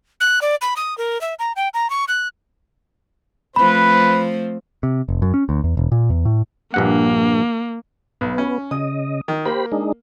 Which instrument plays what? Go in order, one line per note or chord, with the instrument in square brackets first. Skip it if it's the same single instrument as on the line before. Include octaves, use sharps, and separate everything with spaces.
[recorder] F#6
D5
B5
D#6
A#4
E5
A#5
G5
A#5
C#6
F#6
[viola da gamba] F3 A3 C4 [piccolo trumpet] B4 [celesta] B5
[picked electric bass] C3
F1
F#2
C#4
D2
E2
E1
A#2
E2
A2
[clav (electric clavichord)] A#1 G2 F#5 [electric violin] A#3
[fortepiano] B1 [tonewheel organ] B3
[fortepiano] C#4
[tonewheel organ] C#3 D#5 [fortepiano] D#6
[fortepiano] D#3
[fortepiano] A#3 [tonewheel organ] G4 C5 B5
[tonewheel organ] G#3 D4 D#4